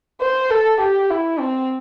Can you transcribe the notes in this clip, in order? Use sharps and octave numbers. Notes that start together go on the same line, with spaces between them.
C5
A4
G4
E4
C4